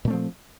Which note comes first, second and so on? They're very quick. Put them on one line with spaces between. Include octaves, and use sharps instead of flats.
A#2 A3 C4 F3